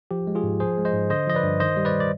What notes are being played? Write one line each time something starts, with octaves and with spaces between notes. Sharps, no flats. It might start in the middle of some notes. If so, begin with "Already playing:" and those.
F3 G4
G#3
F4 G#4
G#2
F3 G#4 C5
G#3
C5 D#5
G#2
D3 C5 D#5
F3 D#5
B4 D5
G2
D#3 C5 D#5
G3
B4 D5
D5